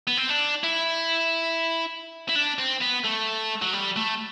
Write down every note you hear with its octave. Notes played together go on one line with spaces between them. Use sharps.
B3
C4
D4
E4
E4
D4
C4
B3
A3
F#3
G3
A3